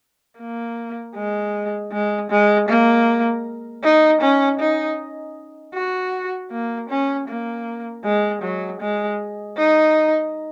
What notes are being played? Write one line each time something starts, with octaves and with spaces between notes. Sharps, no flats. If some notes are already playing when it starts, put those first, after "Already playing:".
A#3
G#3
G#3
G#3
A#3
D#4
C#4
D#4
F#4
A#3
C#4
A#3
G#3
F#3
G#3
D#4